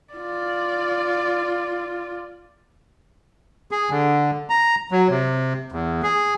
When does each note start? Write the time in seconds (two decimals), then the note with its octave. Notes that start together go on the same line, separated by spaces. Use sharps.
0.14 F4 D5
3.71 G#4
3.90 D3
4.50 A#5
4.91 F#3
5.09 C3
5.72 E2
6.03 G#4